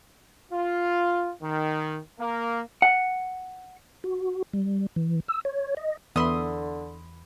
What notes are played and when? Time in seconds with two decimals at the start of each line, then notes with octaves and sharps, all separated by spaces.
0.52 F4
1.43 D#3
2.20 A#3
2.82 F#5
4.04 F#4
4.53 G3
4.96 E3
5.28 E6
5.45 C#5
5.77 D#5
6.16 E2 D3 B3 B4 E5 B5 C6 D#6